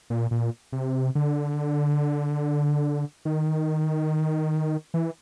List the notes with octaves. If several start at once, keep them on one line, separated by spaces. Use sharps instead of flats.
A#2
A#2
C3
D3
D#3
E3